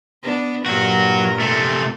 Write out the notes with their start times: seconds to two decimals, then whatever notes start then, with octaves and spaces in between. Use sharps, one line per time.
0.23 B3 D4
0.66 G2 A#2 F#3 F#4 A#4
1.40 C3 A3